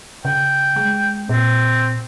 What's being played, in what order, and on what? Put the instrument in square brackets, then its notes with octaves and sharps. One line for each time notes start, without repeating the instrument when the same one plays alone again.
[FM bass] C#3 [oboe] G5
[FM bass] G#3
[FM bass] A#2 [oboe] C4